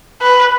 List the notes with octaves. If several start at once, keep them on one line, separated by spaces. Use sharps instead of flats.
B4